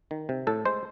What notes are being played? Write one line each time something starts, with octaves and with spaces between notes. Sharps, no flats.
D#3
C3
A2 A4
G#3 C5